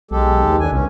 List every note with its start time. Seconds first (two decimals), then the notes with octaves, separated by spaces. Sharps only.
0.11 B1 G#3 G4 A4
0.45 D#2
0.60 D4 G#5
0.72 C2 G2 C#4